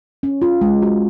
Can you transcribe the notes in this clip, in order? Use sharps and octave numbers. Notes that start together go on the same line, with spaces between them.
C#4
F4
G#3
F#4